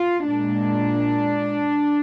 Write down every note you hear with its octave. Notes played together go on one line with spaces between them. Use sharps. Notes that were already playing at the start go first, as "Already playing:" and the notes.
Already playing: F4
A#2 G#3 D4